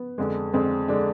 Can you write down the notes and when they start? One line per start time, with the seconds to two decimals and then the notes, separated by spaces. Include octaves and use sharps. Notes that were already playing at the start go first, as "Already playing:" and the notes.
Already playing: B3
0.18 F2 D3 G#3
0.53 F2 D3 G#3 C4
0.88 D3 G#3 D4